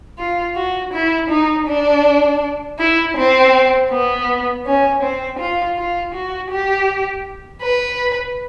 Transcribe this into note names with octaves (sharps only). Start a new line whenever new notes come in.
F4
F#4
E4
D#4
D4
E4
C4
B3
C#4
C4
F4
F4
F#4
G4
B4